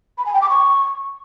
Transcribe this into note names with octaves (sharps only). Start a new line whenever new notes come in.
B5
G#5
G5
D6
C#6